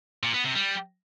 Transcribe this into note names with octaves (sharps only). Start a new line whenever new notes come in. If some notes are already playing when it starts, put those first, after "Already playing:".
A#2
B3
C3
G3